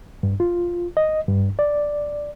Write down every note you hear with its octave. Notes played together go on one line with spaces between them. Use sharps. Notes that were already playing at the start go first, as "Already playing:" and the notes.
G2
F4
D#5
G2
D5